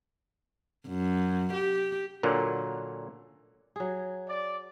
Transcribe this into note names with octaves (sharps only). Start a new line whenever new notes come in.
F#2
G4
A#2 D3 F#3 A#3
F#3 G#4
D5